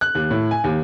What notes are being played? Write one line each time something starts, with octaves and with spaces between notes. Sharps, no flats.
F#6
D#2
A2
G#5
D#2